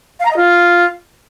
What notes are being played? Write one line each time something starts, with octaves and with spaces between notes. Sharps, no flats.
F5
A#5
D#5
F4